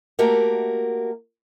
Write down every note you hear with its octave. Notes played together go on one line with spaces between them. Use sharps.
A3 A#3 F#4 G4 A#4